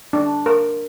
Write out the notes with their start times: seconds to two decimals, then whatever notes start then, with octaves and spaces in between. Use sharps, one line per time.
0.13 D4
0.46 A#4